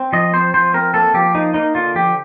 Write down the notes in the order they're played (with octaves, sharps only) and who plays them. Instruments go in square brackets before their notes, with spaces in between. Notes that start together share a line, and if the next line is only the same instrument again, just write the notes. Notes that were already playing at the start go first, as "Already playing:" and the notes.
Already playing: [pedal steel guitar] C4
F3 D#5
C4 C5
F3 C5
C4 A#4
A#3 A4
F3 G4
A#3 D#4
A#3 D#4
D3 F4
F3 G4